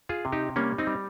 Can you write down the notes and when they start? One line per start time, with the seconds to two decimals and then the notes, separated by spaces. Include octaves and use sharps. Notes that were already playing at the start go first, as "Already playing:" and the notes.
0.09 F4 G#4
0.25 C3
0.32 D#4 G4
0.56 G3 A#3 C#4
0.78 C4 D#4
0.87 G3